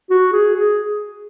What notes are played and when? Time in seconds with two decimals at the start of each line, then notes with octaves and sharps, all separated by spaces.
0.10 F#4
0.32 G#4
0.55 G#4